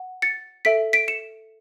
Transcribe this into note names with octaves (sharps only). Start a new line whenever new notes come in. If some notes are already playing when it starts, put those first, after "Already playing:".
Already playing: F#5
A6 C#7
A4 E5 B6 D7
B6 D7
C#7 E7